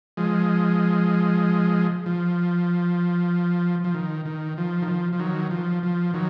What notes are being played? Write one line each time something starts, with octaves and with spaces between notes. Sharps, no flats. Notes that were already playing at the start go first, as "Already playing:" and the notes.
F3 G#3
F3
F3
D#3
D#3
F3
D#3
F3
F3
D#3 F#3
F3
F3
D#3 F#3